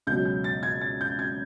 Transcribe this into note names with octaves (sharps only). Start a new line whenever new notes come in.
C#2 B2 F#3 G6
G6
A6
G#6
A6
G6
G#6